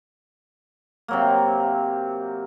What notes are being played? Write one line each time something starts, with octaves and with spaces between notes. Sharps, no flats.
C3 F#3 A#3